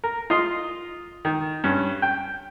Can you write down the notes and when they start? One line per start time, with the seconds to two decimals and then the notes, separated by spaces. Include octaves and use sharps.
0.04 A#4
0.30 F4 D#5 C6
1.25 D#3
1.64 G2 C#4
2.02 G5